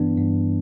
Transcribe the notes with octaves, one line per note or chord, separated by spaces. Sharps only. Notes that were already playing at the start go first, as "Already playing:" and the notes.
Already playing: G2 E3 B3 D4
G2